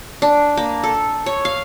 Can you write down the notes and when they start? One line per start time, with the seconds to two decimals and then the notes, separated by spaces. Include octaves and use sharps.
0.22 D4
0.57 A#3
0.83 A4
1.26 C#5
1.45 F5